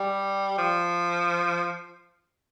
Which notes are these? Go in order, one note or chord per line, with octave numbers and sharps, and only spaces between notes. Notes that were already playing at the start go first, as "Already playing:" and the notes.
Already playing: G3
F3